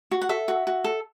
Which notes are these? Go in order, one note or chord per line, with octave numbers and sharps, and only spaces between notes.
F#4
F#5
A4 E5
F#4
F#4
A4